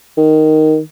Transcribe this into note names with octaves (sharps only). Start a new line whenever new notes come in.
D#3